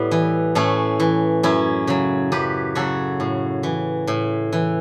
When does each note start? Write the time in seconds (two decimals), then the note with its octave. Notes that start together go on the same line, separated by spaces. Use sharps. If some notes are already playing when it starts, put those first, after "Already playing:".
Already playing: A2 G3 B3
0.11 E3
0.55 A2 A3 C#4
1.00 E3
1.43 F#2 C#4 E4
1.87 C#3 F#3
2.32 F#2 G4 B4
2.75 C#3 F#3 F#4 A4
3.20 A2
3.63 E3
4.07 A2
4.53 E3